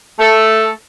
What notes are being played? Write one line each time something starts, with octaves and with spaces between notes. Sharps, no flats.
A3 A4